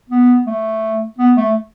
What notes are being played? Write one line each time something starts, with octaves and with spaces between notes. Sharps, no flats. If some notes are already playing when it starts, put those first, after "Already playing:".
B3
A3
B3
A3